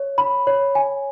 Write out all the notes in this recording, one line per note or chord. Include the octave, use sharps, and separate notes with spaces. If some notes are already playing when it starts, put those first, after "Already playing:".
Already playing: C#5
B5
C#5
G#5